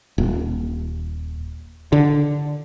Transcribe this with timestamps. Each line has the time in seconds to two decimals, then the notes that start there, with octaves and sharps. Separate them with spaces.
0.18 D#1
1.92 D3